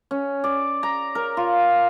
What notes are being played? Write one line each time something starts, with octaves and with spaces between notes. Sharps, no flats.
C#4
D5
A#5
A#4
F4